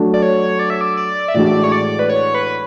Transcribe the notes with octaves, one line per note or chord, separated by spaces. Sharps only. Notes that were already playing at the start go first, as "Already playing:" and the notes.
Already playing: F#3 A3 D4 F#4
D5
C#5
D5
E5
D5
D5
E5
A2 E3 G#3 D4 F#4 D5
C#5
D5
B4
C#5
B4